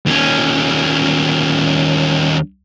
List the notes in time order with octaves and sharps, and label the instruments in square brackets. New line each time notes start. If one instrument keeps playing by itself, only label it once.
[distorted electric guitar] D#2 C#4